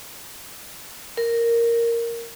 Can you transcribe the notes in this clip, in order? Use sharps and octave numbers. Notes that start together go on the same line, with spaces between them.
A#4